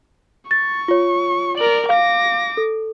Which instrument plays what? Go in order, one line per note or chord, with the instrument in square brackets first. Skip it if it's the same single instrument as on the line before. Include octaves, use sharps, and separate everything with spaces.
[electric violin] C#6 [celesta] A6
[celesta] F4 C#5
[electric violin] A#4 D5 [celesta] F#7
[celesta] F5 [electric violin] D6 A#6
[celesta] A4